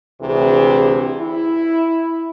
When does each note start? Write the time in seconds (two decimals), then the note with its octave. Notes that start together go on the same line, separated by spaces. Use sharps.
0.20 D2 C3 E3 G#4
1.18 E4